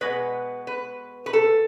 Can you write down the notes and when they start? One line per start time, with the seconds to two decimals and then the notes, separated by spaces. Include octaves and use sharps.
0.01 B2 G#3 B3 B4
0.67 B4
1.26 B4
1.33 A4